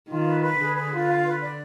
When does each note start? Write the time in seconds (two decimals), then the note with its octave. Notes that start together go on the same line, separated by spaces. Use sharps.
0.08 D#3 F4
0.25 B4
0.42 B4
0.58 D3 G#4
0.75 B4
0.92 F4
1.08 F5
1.25 B4
1.41 D5